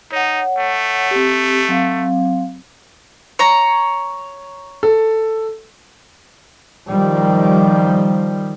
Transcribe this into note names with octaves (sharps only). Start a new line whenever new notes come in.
D#4 C#5 F#5
A3
C4 G4
F#3 C4 F5
C#5 A#5
A4
D#3 F3 G3